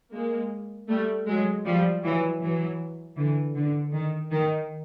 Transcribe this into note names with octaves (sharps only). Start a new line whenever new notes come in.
G#3 A#3
G3 A3
F#3 G#3
F3 G3
E3 F#3
E3 F#3
D3 E3
D3
D#3
D#3